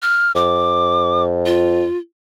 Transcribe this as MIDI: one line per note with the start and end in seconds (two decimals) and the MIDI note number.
0.03 0.32 89
0.35 1.84 41
0.35 1.23 86
1.46 1.98 65